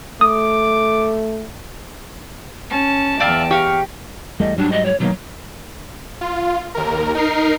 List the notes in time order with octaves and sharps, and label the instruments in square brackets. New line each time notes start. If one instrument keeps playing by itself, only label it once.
[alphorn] A3 [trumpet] D6 [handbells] D#6
[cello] C#4 [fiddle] A5
[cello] E2 G5 [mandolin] D5 E5 F5
[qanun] G4 [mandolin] F5 C#6
[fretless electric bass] E2 G3 A3 [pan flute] D#5
[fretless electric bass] G#2 F#3 G3 [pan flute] D4
[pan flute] D#5
C#5
[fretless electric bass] B2 D#3 A#3 [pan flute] F#3
[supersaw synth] F4
D#2 A#4
D#4 A#4 C7